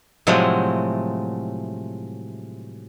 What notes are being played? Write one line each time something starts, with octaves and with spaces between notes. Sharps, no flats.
A2 C3 F3 F#3 G#3 A3